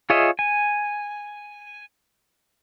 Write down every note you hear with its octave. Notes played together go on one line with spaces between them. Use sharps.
F4 G#4 C#5 D#5 E5
G#5